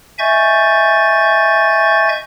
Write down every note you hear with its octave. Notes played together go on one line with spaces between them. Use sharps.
D#5 E5 G#5 C#6 G6 A6